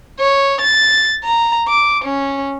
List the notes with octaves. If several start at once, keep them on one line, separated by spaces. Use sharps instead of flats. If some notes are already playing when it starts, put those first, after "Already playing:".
C#5
A6
A#5
D6
C#4